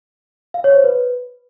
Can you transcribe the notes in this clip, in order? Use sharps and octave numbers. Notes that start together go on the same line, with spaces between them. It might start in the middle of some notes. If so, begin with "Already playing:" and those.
F5
C#5
C5
B4